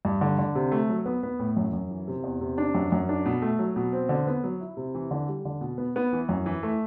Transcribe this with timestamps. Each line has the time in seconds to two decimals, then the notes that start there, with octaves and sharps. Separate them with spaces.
0.05 G2
0.21 D3
0.39 D3
0.55 C3
0.72 A3
0.89 F#3
1.06 B3
1.23 B3
1.39 A2
1.56 F#2
1.73 F#2
1.91 E3
2.08 C3
2.24 E2
2.41 C3
2.58 D4
2.75 F#2
2.92 F#2
3.09 D4
3.26 B2
3.42 A3
3.59 F#3
3.76 B2
3.93 C4
4.09 D3
4.27 B3
4.44 F#3
4.60 E4
4.77 C3
4.94 E3
5.11 D3
5.28 G3
5.45 D3
5.61 B2
5.78 B3
5.96 B3
6.13 E3
6.29 F#2
6.46 E3
6.63 A3